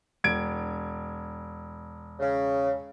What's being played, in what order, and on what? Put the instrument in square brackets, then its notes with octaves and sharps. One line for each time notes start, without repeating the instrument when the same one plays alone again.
[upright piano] E1 G#6 D7
[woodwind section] C#3